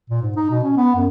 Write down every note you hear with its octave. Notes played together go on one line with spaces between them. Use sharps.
A#2
G#2
D#4
B2
C#4
B3
F#2